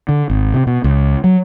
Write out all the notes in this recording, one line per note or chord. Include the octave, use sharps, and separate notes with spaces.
D3
G#1
C3
B2
C#2
F#3